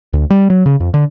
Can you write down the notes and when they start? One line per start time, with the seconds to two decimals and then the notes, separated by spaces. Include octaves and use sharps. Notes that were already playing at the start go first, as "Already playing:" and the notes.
0.13 D2
0.30 G3
0.50 F#3
0.66 C#3
0.80 F2
0.94 D3